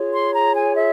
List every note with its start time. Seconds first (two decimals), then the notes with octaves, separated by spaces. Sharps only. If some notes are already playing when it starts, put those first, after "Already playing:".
Already playing: F4 G#4 C#5
0.13 C6
0.33 A#5
0.55 G#5
0.75 E5